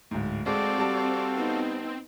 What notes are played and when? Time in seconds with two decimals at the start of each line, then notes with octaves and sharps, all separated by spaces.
0.11 D1 G#2
0.46 G#3 C4 F#4 A4 D5 F5
0.78 G3 A5
1.34 B3 C4 D#4